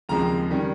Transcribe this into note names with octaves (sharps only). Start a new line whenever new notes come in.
D#2 C#3 F3 G#3 C4 A#5
D#3 G3 C#4